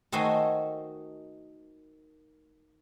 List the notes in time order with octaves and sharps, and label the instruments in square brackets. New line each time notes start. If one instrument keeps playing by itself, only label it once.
[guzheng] D#3 A3 D#4 F#4 C5 G#5